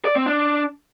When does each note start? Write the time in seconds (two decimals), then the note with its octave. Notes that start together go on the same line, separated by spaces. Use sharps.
0.05 D5
0.16 C4
0.26 D4